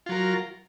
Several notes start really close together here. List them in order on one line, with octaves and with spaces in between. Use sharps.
F4 F#3 A#4